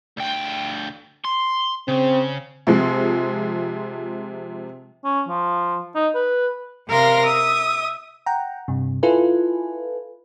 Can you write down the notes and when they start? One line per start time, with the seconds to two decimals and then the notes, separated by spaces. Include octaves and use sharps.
0.17 D2 G5
1.24 C6
1.88 C#3 C4
2.67 C3 F3 G#3
5.04 C#4
5.28 F3
5.95 D#4
6.14 B4
6.89 C3 A#4 F5 C6 A#6
7.23 E5 D#6
8.26 F#5 G5 A#5
8.68 G2 C3
9.03 E4 F4 A4 B4 G#5